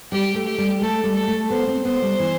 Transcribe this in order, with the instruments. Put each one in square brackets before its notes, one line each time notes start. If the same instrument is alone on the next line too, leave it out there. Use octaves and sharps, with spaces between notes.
[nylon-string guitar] G3 [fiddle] G4
[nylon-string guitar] A3
[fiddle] G4
[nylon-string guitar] G3
[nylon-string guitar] A3 [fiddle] A4
[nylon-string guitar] G3
[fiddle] A4
[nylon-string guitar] A3
[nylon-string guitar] B3 [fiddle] C5
[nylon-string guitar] C4
[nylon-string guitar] B3 [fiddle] C5
[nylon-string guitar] G3
E3